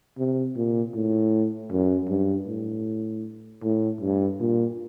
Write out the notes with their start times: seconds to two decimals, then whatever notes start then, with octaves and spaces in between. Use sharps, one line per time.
0.18 C3
0.56 A#2
0.94 A2
1.71 F#2
2.09 G2
2.47 A2
3.63 A2
4.01 G2
4.40 A#2